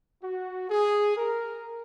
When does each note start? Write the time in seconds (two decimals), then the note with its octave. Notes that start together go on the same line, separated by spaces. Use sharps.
0.23 F#4
0.70 G#4
1.17 A#4